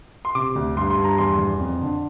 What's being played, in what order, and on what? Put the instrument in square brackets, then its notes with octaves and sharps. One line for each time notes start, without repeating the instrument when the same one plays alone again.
[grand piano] C6
C3 D6
D2
G2 C6
C6
G2
A#5
E2 C6
E2
F2
D3